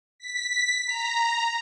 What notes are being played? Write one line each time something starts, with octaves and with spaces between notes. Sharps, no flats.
B6
A#5